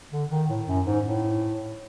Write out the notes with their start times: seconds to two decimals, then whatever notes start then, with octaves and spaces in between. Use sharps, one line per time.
0.12 D3
0.31 D#3
0.49 A2
0.67 F#2
0.86 G#2
1.04 A2